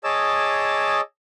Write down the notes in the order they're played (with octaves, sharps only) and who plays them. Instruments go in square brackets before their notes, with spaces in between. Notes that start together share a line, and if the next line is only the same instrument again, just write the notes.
[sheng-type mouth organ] G#4 C#5 D#5 A5 D6 E6